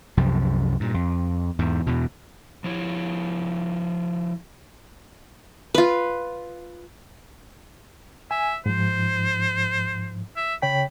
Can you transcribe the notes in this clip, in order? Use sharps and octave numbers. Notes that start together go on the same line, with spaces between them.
C2 F#2 C3 F3
G2 A#2
F2
E2 G#2
E2 B2
F3 E4 C#5
F4 B4
E5 G#5
G#2 F3 C5
E5
C#3 C#5 G5 B5